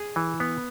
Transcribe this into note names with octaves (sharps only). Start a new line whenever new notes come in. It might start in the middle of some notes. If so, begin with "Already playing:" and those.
Already playing: G#4
E3
B3